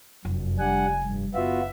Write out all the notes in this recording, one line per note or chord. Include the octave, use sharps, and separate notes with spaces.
F1 F#2
G3 D4 F#5 G#5
G2
F#1 B3 F4 F#4 E5